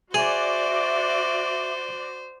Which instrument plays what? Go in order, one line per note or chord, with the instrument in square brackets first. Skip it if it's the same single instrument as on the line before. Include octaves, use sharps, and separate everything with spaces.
[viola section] F#4 D5 [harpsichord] G#4 [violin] C5 [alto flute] E5